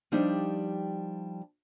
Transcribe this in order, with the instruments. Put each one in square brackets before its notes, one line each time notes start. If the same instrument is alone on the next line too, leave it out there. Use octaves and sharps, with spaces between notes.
[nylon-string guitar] F3 G3 D4 D#4 G4